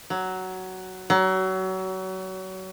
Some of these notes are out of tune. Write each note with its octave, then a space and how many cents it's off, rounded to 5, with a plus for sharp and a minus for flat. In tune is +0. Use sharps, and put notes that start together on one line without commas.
F#3 +10
F#3 +30